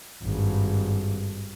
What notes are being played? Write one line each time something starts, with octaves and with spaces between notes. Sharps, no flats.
G#1 G2